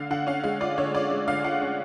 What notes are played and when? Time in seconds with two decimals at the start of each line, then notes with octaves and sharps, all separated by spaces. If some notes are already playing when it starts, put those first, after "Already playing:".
Already playing: D3 F5
0.10 D3 F#5
0.27 C#4 F5
0.44 G#3 F5
0.61 F4 D5
0.78 D3 C#5
0.94 F4 D5
1.11 G#3
1.28 D3 F5
1.45 F4 F#5
1.62 C#4